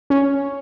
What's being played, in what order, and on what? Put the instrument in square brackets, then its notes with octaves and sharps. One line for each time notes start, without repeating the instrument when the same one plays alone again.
[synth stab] C#4